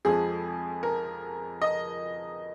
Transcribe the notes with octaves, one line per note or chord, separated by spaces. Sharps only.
F2 F3 G#3 G#4
A#4
D#5